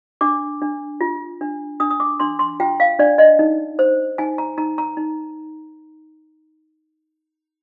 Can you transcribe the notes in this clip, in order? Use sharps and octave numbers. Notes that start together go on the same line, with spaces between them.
D4 D6
D4
F4
D4
D4 D#6
D#6
D6
D4 C6
C6
F4 G5
F5
D4 D5
D#5
D#4
C5
D#4 G#5
A#5
D#4 A#5
A#5
D#4